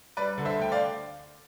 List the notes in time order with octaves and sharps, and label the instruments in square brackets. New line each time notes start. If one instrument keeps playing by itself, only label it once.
[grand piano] G3 B4 D5
D3
C5 E5
D2 G5
D5 F5